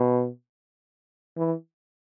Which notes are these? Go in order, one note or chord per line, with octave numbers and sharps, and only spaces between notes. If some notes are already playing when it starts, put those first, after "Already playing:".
Already playing: B2
E3